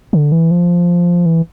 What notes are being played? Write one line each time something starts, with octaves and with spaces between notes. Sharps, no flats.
D3
E3
F3
E3